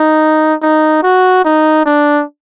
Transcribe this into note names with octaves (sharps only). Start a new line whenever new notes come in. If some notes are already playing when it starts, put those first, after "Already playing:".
Already playing: D#4
D#4
F#4
D#4
D4